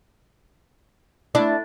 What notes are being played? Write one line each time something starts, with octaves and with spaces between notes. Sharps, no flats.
A3 D4 E4